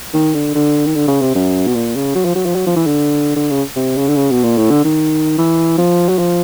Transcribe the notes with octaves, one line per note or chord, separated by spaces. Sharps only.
D#3
D3
D3
D#3
D3
C#3
C3
F#2
B2
A#2
C#3
F#3
F3
F#3
F3
F#3
F3
E3
D3
D3
C#3
C3
C#3
D3
C#3
B2
A#2
A2
D3
D#3
E3
F3
F#3
F3